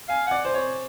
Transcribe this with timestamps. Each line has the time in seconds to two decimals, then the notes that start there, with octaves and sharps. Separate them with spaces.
0.08 F5 G#5
0.26 D5 F#5
0.45 C5
0.54 C#5